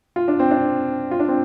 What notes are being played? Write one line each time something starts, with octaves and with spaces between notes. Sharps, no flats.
F4
D4
C4
D4
F4
D4
C4